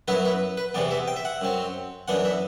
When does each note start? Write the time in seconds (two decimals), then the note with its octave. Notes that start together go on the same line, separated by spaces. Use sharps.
0.08 F#2 F#3 B3 E4 B4
0.25 B4
0.57 B4
0.74 E2 C3 E3 B3 D5
0.91 E5
1.08 G5
1.16 E5
1.25 F#5
1.41 F#2 F#3 C4
2.08 F#2 E3 B3 D4 F#5
2.25 E5